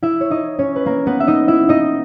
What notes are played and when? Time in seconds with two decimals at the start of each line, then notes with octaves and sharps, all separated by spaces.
0.03 E4 E5
0.21 C#5
0.30 D#4 D#5
0.59 C#4 C#5
0.76 B4
0.86 A#3 A#4
1.06 B3 B4
1.20 E5
1.27 D#4 D#5
1.48 E4 E5
1.69 D#4 D#5